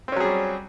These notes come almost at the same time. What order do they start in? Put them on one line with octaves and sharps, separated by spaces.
C4 C#4 F#3 G#4 G3